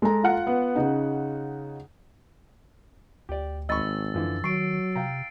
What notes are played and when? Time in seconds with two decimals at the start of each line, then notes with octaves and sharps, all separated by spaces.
0.02 G#3 A4 A#5
0.24 F4 F#5
0.47 B3
0.76 C#3 D#4
3.29 D2 G4 D5
3.69 G#1 D#5 B5 C#6 E6 A6
4.14 F#2 D3 E3 F3
4.44 D#3 F#3 C#6 C7 D7
4.96 C3 F5 G5 A#5